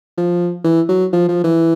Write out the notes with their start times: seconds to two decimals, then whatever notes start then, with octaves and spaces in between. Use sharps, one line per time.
0.18 F3
0.64 E3
0.89 F#3
1.13 F3
1.29 F3
1.44 E3